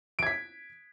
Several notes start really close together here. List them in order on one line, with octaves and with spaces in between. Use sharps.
D7 G#6 B6